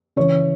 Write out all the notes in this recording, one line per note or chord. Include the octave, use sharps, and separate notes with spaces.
C#3 E3 C#5